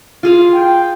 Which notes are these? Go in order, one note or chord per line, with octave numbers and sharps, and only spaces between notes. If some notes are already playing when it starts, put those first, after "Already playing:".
F4 G#4 F5
G5